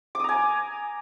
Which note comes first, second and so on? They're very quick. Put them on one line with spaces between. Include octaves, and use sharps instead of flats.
D6 D#6 A#5 G#5